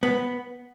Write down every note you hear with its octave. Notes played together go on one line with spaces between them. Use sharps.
B3